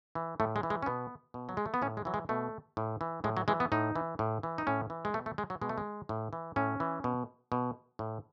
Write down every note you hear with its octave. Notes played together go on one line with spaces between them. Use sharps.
E3
A2 A3
G#3
E3
G#3
C#4
B2 B3
B2
F#3
G#3
A3
B3
A2 C#4
G#3
E3 F#3
G#3
B2 A3
A2
E3
A2 G#3
F#3
E3 G#3
B3
A2 D#4
E3
A2
E3
D#4
A2 C#4
E3
G#3
B2 A3
A3
G#3
F#3
B2 G#3
A3
G#3
A2
E3
A2 C#4
E3
B2
B2
A2